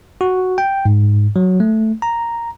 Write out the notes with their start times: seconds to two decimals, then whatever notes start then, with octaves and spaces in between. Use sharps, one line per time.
0.21 F#4
0.58 G5
0.85 G#2
1.36 F#3
1.60 A3
2.02 A#5